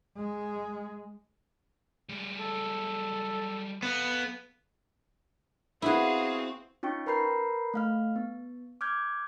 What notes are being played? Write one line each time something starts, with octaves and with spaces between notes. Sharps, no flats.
G#3
G3 G#3
A4
B3 A4 F5
B3 C4 E4 F#4 G#4 F5
C#4 D#4 F4 G5 C#6
A#4 B4 A#5 B5 G6 C7
A3 F5 F6
B3
D6 F6 G6 G#6